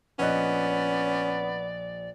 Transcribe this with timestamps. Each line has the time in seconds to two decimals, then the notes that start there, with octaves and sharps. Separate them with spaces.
0.19 A#1 B3 C#4 D5 D#5 F#6